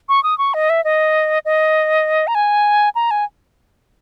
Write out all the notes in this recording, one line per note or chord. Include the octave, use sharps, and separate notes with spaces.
C#6
D#6
C#6
D#5
E5
D#5
D#5
A#5
G#5
A#5
G#5